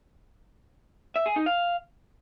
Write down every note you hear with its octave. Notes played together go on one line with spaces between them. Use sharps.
E5
G#4
D#4
F5